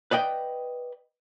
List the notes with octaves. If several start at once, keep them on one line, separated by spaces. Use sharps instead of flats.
B4 D5 D#5 G5